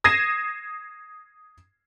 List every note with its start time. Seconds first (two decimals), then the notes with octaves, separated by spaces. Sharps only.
0.04 D#6 G#6 A#6 C7 D#7 E7